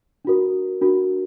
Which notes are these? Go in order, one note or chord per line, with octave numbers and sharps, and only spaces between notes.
D4 F#4 A#4
D4 F#4 A#4